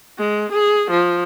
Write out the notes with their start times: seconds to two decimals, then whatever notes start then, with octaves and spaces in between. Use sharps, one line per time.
0.18 G#3
0.52 G#4
0.91 F3